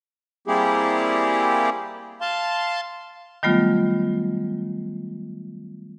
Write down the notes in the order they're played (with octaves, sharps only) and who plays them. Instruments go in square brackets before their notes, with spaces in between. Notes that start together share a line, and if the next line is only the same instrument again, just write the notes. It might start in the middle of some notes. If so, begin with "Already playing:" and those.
[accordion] G3 A#3 C4 E4 G4 G#4
F5 A5 C6
[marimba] D#3 F#3 G3 A3 B3 F4